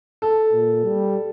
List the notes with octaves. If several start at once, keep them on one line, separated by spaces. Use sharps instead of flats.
A4
A#2
G3